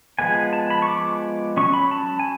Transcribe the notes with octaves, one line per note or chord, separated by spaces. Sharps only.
F3 G#3 B3 G#5
A5
B5
C#6
D6
F#3 C#4 C#6
B5
A5
G#5